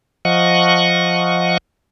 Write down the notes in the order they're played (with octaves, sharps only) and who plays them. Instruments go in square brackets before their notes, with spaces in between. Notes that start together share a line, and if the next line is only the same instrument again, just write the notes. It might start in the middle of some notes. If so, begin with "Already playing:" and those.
[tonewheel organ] F3 D#5 F#5 C#6